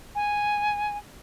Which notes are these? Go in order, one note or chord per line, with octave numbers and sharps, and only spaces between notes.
G#5